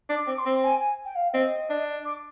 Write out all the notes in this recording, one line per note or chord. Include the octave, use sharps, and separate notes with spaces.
D4
D6
C4
D6
C6
C4
G#5
G#5
G5
F5
C4 D#5
D4
D6